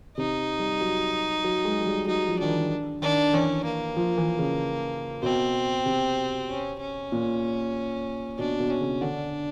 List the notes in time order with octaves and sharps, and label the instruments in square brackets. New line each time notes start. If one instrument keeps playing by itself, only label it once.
[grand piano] C3 [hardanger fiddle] D#4
[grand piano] G3
F#3
F#3
G#3
F#3
G3
[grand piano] F#3 [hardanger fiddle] D#4
[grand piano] F3
[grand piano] D#3 [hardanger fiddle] D4
[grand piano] E3
[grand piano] D#3 [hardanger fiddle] D4
[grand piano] E3 [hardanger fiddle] C#4
[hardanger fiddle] A#3
[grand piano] F3
E3
C#3
[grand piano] B2 [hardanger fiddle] C4
[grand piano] C3
[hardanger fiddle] C#4
C#4
[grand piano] A#2
[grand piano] B2 [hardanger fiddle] D4
[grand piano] B2
[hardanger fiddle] C#4
[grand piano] C#3
[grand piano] D3 [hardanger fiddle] D4